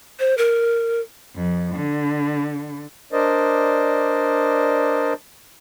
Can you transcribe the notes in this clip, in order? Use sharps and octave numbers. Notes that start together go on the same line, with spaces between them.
C5
A#4
F2
D3
D4 A#4 C5 D5 D#5